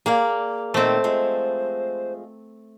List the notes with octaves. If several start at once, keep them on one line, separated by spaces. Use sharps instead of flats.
A#3 G#4 D5 F5
A#2 D#3 A3 C4 C5
F3 G#3